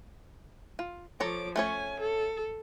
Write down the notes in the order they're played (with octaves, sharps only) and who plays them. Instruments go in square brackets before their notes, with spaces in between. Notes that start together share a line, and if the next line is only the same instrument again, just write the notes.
[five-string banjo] F4
[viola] F3 D6 [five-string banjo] A4 C#5 A#5
[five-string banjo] A3 C#4 C#5 [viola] G#5
[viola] A4